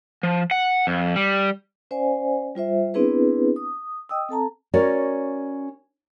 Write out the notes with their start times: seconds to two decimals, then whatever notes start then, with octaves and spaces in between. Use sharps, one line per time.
0.23 F3
0.51 F#5
0.87 F2
1.16 G3
1.91 C#4 C5 D5 F5 G#5
2.55 G3 F4 C5 E5
2.94 B3 C4 D4 E4 G#4 B4
3.56 D#6
4.09 D#5 G5 D#6 E6
4.29 C4 A4 A5 A#5
4.74 C#4 F#4 A#4 C#5 D5